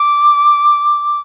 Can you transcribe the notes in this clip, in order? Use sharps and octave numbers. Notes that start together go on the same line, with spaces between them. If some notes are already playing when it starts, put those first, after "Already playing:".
Already playing: D6